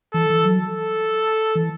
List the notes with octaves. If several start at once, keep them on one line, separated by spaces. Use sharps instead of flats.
E3 A4
E3
F#3
A4
E3